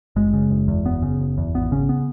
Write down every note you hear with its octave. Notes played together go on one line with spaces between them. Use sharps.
F#1 G#3
C#3
F#1
E2
F#1 B3
C#3
F#1
E2
G#1 B3
C#3 C#4
B3